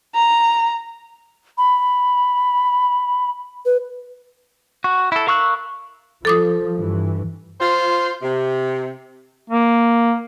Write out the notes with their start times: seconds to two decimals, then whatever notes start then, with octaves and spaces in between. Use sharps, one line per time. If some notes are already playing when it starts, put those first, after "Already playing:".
0.15 A#5
1.58 B5
3.65 B4
4.84 F#4
5.12 E4 A4
5.27 A#4 F5 C#6 E6 F#6
6.25 F3 A4 D6 D#6
6.75 G2 E3
7.60 F4 C5
8.22 C3
9.50 A#3